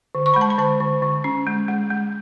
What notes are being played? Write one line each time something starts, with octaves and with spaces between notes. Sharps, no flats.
D3
C#6
G#3 B5
A5
B5
D3 A5
D3
D3
C#4
G#3
G#3
G#3